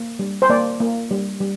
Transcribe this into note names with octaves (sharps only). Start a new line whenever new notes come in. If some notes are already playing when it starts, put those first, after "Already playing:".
Already playing: A#3
G3
C5
A#3 D5
A#3
G3
G3